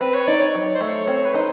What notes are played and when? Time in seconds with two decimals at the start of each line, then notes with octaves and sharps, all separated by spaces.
0.01 C4 B4
0.14 C#5
0.28 D#4 D5
0.41 C#5
0.55 F#3
0.75 C5
0.81 A3 C#5
1.07 C4 C#5
1.25 B4
1.34 D#4 C5